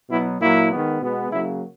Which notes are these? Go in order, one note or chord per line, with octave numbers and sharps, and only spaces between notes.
B2 F#3 B3 E4
A#2 F#3 A#3 E4
D#3 G#3 B3
B2 G#3 B3
C#3 F#3 A#3 E4